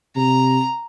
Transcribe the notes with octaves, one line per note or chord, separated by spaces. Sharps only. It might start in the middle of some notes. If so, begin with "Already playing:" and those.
C3 A#5